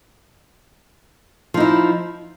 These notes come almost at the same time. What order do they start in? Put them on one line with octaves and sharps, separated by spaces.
F3 D#4 E4